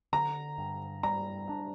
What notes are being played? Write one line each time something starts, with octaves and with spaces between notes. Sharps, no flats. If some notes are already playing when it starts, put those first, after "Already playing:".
D3 A#5
G2
G3 A#5
D4